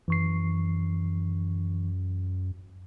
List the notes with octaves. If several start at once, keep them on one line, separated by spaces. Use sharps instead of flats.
F#2 E3 C#6 C7